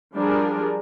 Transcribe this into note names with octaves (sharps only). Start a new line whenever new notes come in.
F3 G3 D4 G#4 A#4